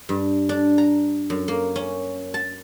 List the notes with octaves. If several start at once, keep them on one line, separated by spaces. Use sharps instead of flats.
G2
D4
A#5
F#2
A#3
C#4
A5